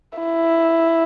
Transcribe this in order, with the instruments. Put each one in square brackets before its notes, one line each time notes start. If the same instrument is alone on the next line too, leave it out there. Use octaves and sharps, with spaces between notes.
[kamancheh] E4